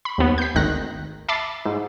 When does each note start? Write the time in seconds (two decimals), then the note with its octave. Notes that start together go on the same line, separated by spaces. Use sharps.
0.05 B5
0.18 D#2 B3
0.38 G6 B6
0.55 G#1 D2 D#3 F#6 A#6
1.28 E5 A5 B5 D6 A6 C7
1.65 G#2